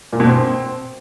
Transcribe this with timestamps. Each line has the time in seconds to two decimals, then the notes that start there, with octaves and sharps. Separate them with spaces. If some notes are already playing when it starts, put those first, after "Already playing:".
0.13 A#2
0.20 B2
0.27 C4